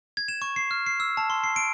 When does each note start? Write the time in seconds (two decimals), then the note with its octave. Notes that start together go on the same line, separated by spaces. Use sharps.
0.17 G#6
0.28 E7
0.42 C#6
0.56 C7
0.71 F6
0.86 C7
1.00 E6
1.17 A5
1.30 C6
1.44 C7
1.56 D7